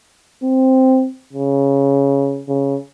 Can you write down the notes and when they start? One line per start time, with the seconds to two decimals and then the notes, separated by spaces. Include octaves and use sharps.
0.43 C4
1.33 C#3
2.49 C#3